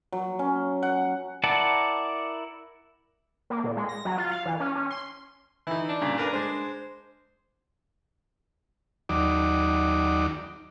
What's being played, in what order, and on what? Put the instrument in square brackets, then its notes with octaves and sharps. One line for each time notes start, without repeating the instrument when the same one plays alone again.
[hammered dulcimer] F#3
C#4
F#5
[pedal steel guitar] E4 A#4 D5 F#5 A5
[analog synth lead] A#3
A#2
G#3
A#6
F#3
F4
F5
E3
C#4
C#4
C6
[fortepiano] E3 D#4 [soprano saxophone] E4
[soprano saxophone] D4
[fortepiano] G2 A#2 C#3
[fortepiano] D4 A#4 B4 [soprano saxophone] A#5
[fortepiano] G#3 D4 [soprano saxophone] C5
[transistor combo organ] D#2 F#3 D#4 D5 D6